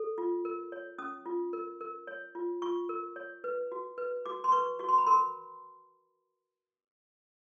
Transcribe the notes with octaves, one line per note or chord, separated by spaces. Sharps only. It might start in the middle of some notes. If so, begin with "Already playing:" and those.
Already playing: A4
F4
A#4
C#5
C#4 D#6
F4
A#4
A#4
C#5
F4
F4 C#6
A#4
C#5
B4
F#4
B4
F#4 D6
C6
B4 C#6
F#4 C#6
C6
B5
A#4 C6